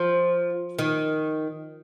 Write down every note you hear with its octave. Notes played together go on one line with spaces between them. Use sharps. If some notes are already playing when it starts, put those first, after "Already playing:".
Already playing: F3
D#3